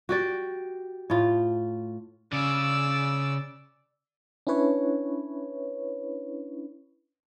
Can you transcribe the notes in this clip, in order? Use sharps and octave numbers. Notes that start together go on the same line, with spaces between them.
F#4 G4 D5
A2 F4
C#3 D5 E6
C#4 D4 E4 B4 C#5